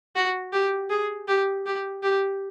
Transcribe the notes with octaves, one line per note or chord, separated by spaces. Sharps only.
F#4
G4
G#4
G4
G4
G4